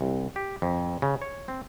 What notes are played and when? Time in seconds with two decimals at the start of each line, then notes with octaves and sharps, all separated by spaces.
0.01 C2
0.36 G4
0.62 F2
1.02 C#3
1.21 C#5
1.48 C4